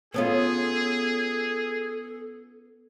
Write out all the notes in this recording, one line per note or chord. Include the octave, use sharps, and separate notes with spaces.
B3 C#4 F4 G#4 A4